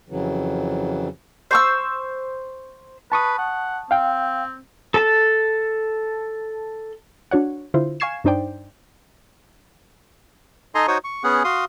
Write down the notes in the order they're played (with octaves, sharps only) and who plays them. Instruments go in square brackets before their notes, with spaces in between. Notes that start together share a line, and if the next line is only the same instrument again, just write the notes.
[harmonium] F2 C#3 E3 F#3
[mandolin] C5 C#6 E6
[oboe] B4 [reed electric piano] A5 C#6 D#6
[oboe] F#5
[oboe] C4 [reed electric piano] F5 G5
[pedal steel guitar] A4 A5
[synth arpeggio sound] D4 F#4 C#5 F#5
D3 E4 F4 C5
F5 G#5 C#6 G#6 C7 E7
G2 D4 D#4 C5 D5 G5
[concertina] D#4 A4 D#5 G#5 A#5 C6
D#4 F#4 C5 C#5 C#6 D#6
C#6
B3 C#4 G#4 F#5
F#4 F5 C6 D#6